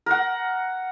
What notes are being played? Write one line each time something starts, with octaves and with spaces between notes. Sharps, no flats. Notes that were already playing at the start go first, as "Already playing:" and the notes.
A#4 F#5